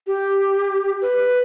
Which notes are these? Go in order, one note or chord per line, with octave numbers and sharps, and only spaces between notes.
G4
B4